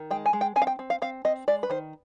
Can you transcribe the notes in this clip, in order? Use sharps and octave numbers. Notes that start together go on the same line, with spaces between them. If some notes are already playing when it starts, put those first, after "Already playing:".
Already playing: D#3
G#3 G5
G#5
G#3
G5
C4 G#5
F5
G5
C4
F5
C4 F5
C4 D#5
G#3 D5
B4
D#3 C5